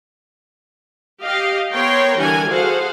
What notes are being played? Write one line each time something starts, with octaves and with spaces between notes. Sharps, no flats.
G4 D#5 F5
B3 A#4 C#5 G5 A#5 C6
D3 E3 G3 A#4 F#5 G#5
F#4 G#4 A4 C5 F5 F#5